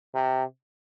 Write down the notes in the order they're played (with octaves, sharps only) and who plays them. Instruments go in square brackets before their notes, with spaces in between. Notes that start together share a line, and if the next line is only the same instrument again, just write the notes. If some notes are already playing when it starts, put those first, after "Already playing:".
[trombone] C3